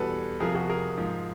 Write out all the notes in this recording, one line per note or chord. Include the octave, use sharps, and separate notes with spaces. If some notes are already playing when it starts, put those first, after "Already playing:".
Already playing: E2 B2 G3 A4 B4
F2 C3 F3 G#4 A#4
F#4 G#4
G#4 A#4
G#2 F3